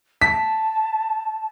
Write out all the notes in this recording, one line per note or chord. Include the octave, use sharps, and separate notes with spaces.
A5 B6